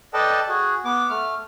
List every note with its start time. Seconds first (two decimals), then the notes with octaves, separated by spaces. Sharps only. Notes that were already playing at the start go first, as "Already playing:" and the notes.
0.14 A4 B4 D5 D#5 G5 A5
0.49 F#4 G#4
0.85 B3 D6
1.10 A3 F6